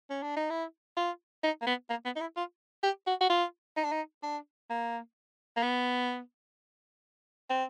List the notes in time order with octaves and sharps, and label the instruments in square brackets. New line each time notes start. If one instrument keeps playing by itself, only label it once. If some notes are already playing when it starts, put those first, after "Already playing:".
[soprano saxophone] C#4
D4
D#4
E4
F4
D#4
A#3
B3
A#3
B3
D#4
E4
F4
G4
F#4
F#4
F4
D#4
D4
D#4
D4
A#3
A#3
B3
C4